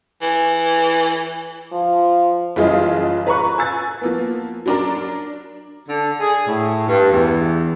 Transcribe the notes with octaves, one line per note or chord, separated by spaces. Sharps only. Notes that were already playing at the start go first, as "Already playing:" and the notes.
E3
F3
F#1 E3 G3 F4 G#4 D#5
B4 A#5 B5 C#6 F#6
G#5 E6 A6
F3 A#3 B3
F#3 D4 A#4
D3
G#4
A2
G2
E2